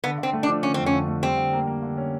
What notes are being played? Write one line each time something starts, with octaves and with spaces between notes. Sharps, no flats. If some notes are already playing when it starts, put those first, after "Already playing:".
D3 B3
D3 C4
A3
D4
F3
D3 C#4
F2 C4
C#4
D3
A3
G3 C4
D3
A#3
A#3
D3
C#4